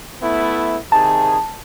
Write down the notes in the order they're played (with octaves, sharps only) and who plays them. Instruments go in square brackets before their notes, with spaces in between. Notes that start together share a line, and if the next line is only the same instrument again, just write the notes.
[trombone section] A3 B3 E4
[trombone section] C3 D#3 G#4 [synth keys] A5